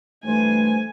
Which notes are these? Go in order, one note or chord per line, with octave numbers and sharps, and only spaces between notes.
G2 E3 A3 C5 G#5